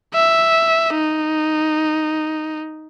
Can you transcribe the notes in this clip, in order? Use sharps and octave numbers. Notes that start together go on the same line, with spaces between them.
E5
D#4